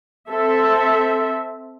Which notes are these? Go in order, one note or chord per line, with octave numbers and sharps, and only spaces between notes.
C4 A4 E5